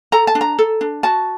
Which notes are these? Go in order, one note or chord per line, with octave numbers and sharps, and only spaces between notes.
A4 A#5
A5
D4
A#5
A4
D4
F#4 A5